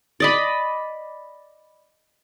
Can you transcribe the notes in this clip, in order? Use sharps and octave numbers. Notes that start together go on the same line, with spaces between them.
D5 D#5 B5